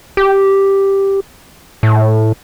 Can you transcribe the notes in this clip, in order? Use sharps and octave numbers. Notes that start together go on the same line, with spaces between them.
G4
A2